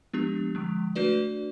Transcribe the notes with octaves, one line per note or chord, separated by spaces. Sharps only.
F3 G#3 B3 D4 G4
D3 F3 G#3
A3 D4 F#4 B4 D5